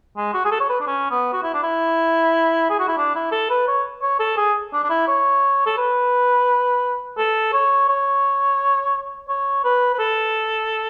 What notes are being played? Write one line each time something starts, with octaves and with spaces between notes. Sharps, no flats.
G#3
F#4
G#4
A4
C#5
B4
D4
C#4
B3
F#4
E4
D4
E4
G#4
F#4
E4
D4
E4
A4
B4
C#5
C#5
A4
G#4
D4
D4
E4
C#5
A4
B4
A4
C#5
C#5
C#5
B4
B4
A4